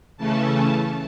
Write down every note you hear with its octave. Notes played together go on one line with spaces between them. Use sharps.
C#3 E3 A3 C#4 A5